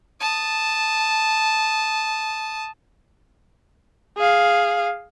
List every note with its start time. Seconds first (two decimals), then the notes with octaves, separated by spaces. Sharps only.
0.20 A5 D#6
4.17 G#4 F5